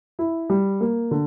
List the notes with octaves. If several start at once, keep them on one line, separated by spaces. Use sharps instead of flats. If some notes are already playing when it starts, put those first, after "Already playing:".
E4
G3
A#3
D3